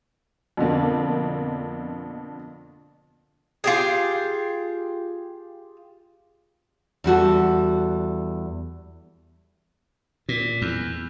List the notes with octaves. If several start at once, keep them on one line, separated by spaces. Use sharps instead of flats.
F2 B2 D3 A#3
F4 G4 G#4
E2 G3 F#4 A4
A#2
E2